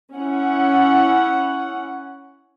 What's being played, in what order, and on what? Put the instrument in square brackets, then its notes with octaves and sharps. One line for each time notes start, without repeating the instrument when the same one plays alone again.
[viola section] C#4 E4 F#5